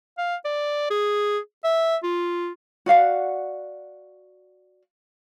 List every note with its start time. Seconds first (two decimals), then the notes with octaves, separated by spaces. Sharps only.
0.18 F5
0.45 D5
0.90 G#4
1.64 E5
2.03 F4
2.86 F#4 D5 F5 F#5